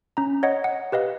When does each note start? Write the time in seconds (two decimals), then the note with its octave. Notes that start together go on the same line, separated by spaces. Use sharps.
0.17 C#4 A#5
0.43 C#5 D#5 F#5
0.64 F#5
0.92 G4 B4 D#5 F5